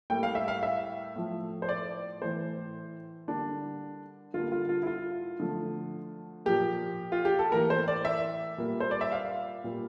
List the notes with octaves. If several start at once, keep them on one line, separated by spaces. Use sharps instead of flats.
A2 G3 A#3 G5
F5
E5
F5
E5
A2 F3 A3
C5
D5
A2 E3 A3 C5
D3 G3 A#3 D4
D3 G3 A#3 F4
F4
F4
E4
F4
D3 F3 A3
A#2 F3 A#3 G4
F4
G4
A4
A2 E3 A#3 A#4
C5
D5
E5
A#2 G3 A#3
C5
D5
E5
F5
A#2 G3 A#3